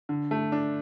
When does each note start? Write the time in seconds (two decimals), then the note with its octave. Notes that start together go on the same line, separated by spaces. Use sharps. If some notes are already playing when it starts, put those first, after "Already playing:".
0.09 D3
0.31 A3
0.52 D4